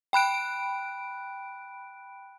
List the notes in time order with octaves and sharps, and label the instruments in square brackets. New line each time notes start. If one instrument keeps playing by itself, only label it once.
[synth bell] G5 B5 F#6 D7